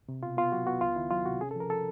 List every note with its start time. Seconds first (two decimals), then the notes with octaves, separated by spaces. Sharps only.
0.09 C3
0.23 B2 F4
0.37 B3 F4
0.52 F#3 F#4
0.67 B3 F#4
0.81 C#2 F4
0.96 D#3 E4
1.11 F#3 F4
1.26 C3 F#4
1.40 C#4 G#4
1.51 A4
1.56 F3 A#4
1.69 F3 A4